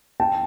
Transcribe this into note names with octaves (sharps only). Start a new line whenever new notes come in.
G5 A5